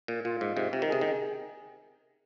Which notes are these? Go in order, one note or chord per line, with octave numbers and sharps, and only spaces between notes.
A#2
A#2 F4
G#2
G#2 C3
C3
D#3
C3 G#4
D#3